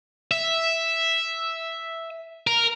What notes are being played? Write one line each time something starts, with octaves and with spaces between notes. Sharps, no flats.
E5
A#4